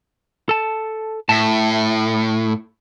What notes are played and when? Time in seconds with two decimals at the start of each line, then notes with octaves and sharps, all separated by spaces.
0.49 A4 A5
1.29 A2 E5 A5